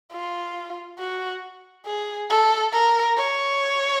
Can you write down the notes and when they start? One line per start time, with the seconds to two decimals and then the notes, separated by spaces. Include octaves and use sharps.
0.12 F4
0.99 F#4
1.86 G#4
2.30 A4
2.72 A#4
3.16 C#5